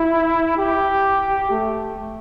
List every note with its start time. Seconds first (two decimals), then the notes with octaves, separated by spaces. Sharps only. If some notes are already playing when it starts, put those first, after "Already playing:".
Already playing: E4
0.57 G4
1.50 A3